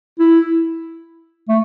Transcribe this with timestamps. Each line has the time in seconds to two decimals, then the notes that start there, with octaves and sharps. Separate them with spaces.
0.19 E4
1.48 A3